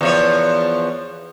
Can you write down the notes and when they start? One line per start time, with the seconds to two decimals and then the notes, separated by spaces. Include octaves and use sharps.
0.01 E2 F3 C#5